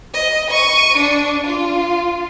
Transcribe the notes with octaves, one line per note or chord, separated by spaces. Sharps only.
D#5
C#6 D#7
D4
F4